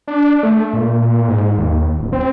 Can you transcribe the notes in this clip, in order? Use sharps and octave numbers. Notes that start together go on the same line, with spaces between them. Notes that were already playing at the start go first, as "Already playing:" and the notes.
D4
A3
A#2
G#2
D#2
D1
C4